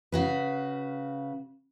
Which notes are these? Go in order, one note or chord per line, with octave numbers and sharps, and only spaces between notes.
C#3 F#4 B4